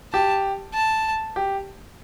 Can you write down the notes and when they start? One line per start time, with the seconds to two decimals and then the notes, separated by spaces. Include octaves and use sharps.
0.13 G4 A5
0.74 A5
1.36 G4